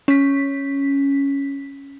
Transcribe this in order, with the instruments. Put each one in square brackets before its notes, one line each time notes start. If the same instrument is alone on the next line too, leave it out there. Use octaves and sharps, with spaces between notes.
[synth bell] C#4 B6